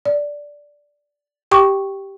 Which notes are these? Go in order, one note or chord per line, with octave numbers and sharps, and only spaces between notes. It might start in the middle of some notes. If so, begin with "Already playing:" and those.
D5
G4 G5 C#6 D6